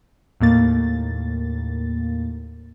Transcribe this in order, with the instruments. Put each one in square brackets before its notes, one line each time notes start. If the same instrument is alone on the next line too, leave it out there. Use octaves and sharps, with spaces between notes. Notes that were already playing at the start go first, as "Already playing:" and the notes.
[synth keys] D#2 A2 A#3 A6